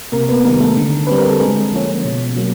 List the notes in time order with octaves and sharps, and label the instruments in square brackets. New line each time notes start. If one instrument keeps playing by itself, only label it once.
[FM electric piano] C3 A#3 A#4
B3 B4
D#3 G3 A#3 A#4
A3 A4
D3
G3 C4 B4
A#4
A4
D3 G#3 G#4
F3 A#3 C#4
B2
F#3 A#3